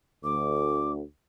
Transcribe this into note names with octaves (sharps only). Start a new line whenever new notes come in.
D2 D6